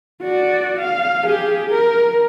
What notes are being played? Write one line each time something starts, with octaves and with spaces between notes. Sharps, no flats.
F#4 D5
F5
G4 G#4
A#4